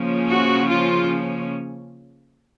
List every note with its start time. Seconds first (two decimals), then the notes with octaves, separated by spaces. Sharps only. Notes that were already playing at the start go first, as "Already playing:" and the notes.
Already playing: C#3 F3 A#3 C#4
0.29 F#4
0.69 F4